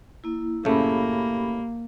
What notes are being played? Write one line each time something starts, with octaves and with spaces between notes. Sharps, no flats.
A#3 E4
F#2 A2 C#3 A3 A#3 G4 B5